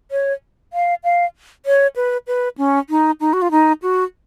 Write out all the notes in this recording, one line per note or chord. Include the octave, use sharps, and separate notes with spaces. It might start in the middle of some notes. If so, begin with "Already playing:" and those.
C#5
F5
F5
C#5
B4
B4
C#4
D#4
D#4
F#4
F4
D#4
F#4